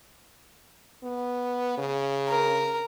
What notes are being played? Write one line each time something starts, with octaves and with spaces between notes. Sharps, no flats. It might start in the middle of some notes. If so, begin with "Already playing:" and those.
B3
C#3
A#4